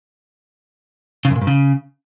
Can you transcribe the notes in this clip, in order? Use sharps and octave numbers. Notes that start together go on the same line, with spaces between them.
C#3
F#2
A#2
G2
C#3